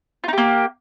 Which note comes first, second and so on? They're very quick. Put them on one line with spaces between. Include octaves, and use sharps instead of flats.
F4 D#4 G4 A#3